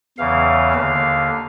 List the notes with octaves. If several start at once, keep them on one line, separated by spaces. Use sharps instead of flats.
E2 C#3 E3 F5
D#2 D3 F5